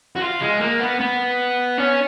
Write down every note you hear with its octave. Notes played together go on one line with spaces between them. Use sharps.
F#4
F4
G#3
A#3
B3
B3
C#4